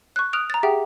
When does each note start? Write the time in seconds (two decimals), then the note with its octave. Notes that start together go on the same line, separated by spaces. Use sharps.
0.16 C#6 F#6
0.33 D#6 F6 F#6 D7 F7
0.50 A#5 A6
0.63 G4 G#4 E5 F#5 G5